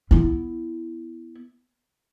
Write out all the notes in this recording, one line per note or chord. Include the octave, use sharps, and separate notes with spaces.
B3 E4